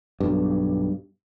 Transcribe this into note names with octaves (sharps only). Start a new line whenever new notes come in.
B1 G2